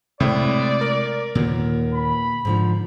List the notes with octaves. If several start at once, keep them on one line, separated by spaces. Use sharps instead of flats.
A2 C3 G#3 A3 C4 E4 D5
A#4
D#2 A#2 D3 B3
B5
G#2 D3 F3